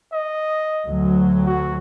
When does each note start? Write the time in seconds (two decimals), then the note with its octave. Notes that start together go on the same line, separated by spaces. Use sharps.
0.13 D#5
0.88 D2 F#3
1.46 F#4